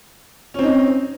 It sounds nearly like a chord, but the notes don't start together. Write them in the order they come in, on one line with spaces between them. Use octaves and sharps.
C#4 C4 D#4